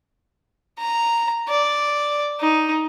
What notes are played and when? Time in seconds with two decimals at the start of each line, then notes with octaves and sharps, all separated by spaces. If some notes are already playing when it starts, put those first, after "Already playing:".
0.79 A#5
1.49 D5
2.40 D#4